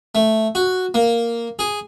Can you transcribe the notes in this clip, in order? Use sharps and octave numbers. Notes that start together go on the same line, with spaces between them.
A3
F#4
A#3
G#4